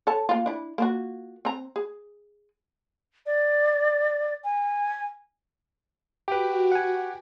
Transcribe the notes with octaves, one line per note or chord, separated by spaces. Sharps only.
A4 C#5 A5
A#3 F4
D4 E4
A#3 F4 F#4
C4 A#5
G#4
D5
G#5
F#4 G4 B4 G5
F#5 G#5